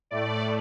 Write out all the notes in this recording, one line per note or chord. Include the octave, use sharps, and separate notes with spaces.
A2 A3 D5